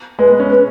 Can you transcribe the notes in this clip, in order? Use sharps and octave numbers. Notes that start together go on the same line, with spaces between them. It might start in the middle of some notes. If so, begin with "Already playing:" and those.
G#3 B4
B3
C#4
B4